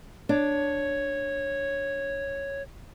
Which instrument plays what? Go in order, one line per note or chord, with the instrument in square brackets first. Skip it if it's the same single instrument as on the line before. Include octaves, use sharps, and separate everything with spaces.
[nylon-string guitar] D4 [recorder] C#5